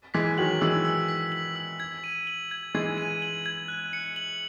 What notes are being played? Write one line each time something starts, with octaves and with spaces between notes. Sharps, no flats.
E3 G#3 B6
D#3 F#3 F#7
E3 G#3 E6
E6
B6
F#7
E6
G#6
D#7
F#7
G#6
E3 G#3 G#6
D#7
F#7
G#6
F#6
C#7
F#7